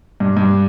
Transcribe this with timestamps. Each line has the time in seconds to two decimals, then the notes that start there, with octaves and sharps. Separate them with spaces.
0.20 G2
0.37 G2